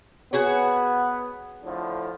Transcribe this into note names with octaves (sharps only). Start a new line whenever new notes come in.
B3 F#4 G#4 C#5
A2 D3 F3